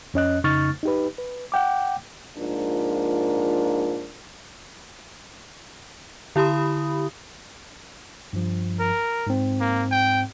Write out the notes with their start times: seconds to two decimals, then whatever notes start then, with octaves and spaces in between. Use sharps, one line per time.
0.14 F2 C#4 D#5 F#6
0.44 F2 C#3 D#4 C#6 F6 A6
0.83 D#4 G4 B4
1.18 B4
1.52 F#5 G5 D6
2.38 G#2 F3 A#3 D4 F4 A#4
6.36 D3 E4 G4 B5 D#6
8.33 G2 F3
8.80 A#4
9.27 G#2 C4
9.60 A#3
9.91 G5